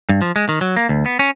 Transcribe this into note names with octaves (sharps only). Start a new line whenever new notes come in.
G2
F3
G#3
D#3
F#3
A#3
D2
B3
C#4